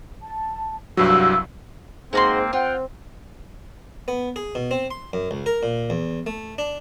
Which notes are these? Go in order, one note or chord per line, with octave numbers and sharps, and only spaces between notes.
A5
C2 G2 F#3 F5 E6
G#2 A#3 C4 C#4 F#4 C6
C4 F4 F#5 G5
B3
G#4
B2
C4
C6
F#2
C#2
A#4
A#2
E2
A3
D4